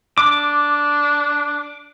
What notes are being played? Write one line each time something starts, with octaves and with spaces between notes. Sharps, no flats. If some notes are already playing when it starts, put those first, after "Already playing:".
D4 D6